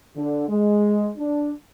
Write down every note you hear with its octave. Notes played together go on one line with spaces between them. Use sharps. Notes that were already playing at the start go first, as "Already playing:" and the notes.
D3
G#3
D4